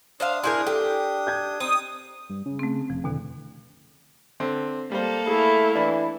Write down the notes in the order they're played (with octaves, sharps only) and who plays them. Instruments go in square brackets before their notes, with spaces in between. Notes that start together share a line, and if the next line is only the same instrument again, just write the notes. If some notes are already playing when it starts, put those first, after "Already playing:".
[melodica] D4 D#6 [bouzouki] C5 E5 F5
[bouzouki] E4 G#4 A#4 [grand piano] C6 G6
[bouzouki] G4 [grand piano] A4
[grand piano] G6 G#6
[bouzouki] C4 [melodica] D#4 [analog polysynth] D#6
[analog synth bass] G2
C#3
[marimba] A3 C4
[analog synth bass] F1 [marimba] F3
[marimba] E2 B2 D#3 [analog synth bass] D3
[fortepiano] D3 C4
[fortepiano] G3 C5 [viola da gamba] A#3 A4
[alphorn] A3 [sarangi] E4 [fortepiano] G#4
[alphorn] E3 [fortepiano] D4